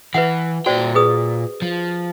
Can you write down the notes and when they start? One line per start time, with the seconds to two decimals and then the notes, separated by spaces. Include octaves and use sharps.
0.14 E3 B4 E5 F#5
0.66 A#2 F#4 C5 D5 G5
0.95 G#4 B4 D#6
1.62 F3